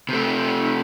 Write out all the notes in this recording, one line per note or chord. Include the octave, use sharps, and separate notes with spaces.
C3 A3